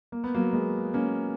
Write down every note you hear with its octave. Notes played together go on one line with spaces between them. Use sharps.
A#3
B3
F#3 A#3
G#3 B3
A#3 C#4